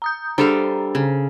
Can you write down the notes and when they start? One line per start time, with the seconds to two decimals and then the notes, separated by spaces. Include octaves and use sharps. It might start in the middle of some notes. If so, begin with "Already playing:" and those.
0.02 A#5 D#6 G6
0.38 G3 D4 A4 C5 F5 A#5
0.95 C#3